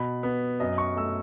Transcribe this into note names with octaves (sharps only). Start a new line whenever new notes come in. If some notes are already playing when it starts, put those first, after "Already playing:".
Already playing: B2 B5
B3
F#2 D#5
C#6
A3 E6